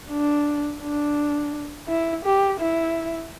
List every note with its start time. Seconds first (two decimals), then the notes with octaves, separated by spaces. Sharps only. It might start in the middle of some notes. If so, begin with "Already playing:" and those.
0.10 D4
0.81 D4
1.88 E4
2.25 G4
2.60 E4